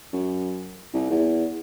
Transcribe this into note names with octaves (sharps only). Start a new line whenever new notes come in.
F#2
C2
E2